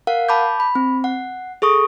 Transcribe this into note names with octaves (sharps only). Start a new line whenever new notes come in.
A#4 F5 F#5
A5 B5 D6 G6
B5
C4
F#5
G#4 A4 C#6 D#6